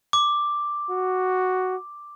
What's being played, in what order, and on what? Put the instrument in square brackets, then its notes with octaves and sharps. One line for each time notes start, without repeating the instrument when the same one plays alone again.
[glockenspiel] D6
[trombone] F#4